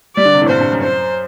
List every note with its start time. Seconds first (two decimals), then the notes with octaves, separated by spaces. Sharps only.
0.16 G3 D5
0.25 D3
0.34 C3
0.41 A2
0.49 G2 C5
0.60 G2
0.72 F#2
0.83 C5